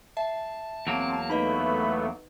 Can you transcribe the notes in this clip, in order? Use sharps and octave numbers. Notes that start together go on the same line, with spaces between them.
E5 A5
E2 F#3 A#3 C4
A3 B3 D#4 B4 D#5 B5